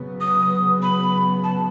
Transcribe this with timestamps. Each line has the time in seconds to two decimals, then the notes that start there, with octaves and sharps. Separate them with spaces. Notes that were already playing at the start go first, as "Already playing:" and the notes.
Already playing: C#3 F#3 B3
0.20 D#6
0.82 B5
1.43 A5